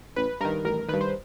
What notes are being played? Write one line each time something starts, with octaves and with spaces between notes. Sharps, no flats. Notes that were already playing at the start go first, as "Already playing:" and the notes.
A1 B4
G2 D#3 A#4
A1 A#4
G2 D#3 B4
C5